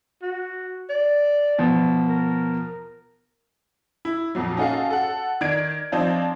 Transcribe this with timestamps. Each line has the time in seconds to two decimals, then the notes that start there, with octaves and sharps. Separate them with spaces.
0.22 F#4
0.89 D5
1.58 B2 F3
2.08 A#4
4.05 E4
4.35 F2 A#2 F#3
4.57 C#4 D#4 F#4 A4 F5
4.90 A4 F#5
5.41 D#3 D5 G#6 D7
5.92 F3 C4 D4 D#4 F4